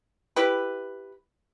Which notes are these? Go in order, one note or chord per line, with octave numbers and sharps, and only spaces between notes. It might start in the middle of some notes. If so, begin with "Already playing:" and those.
E4 G4 B4